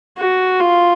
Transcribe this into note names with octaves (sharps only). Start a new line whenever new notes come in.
F#4
F4